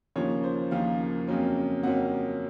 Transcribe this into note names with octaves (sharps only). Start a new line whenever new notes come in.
D#2 C#3 F3 A#3 C#5
C5
D#2 C#3 F3 A#3 F5
F2 C#3 F#3 A#3 C#4
F2 C#3 F#3 A#3 C#4 F#5